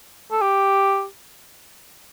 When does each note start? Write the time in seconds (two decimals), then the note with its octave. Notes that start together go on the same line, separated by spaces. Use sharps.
0.31 A4
0.41 G4